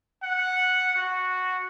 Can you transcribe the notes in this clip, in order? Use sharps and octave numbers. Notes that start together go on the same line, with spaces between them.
F#5
F#4